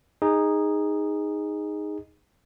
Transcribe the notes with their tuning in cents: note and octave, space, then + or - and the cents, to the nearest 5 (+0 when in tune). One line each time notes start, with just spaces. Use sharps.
D#4 +0 G#4 -15